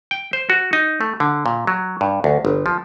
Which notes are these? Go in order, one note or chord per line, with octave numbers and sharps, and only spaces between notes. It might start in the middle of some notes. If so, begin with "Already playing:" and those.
G5
C5
F#4
D#4
A3
D3
A#2
F#3
G2
D2
G1
F3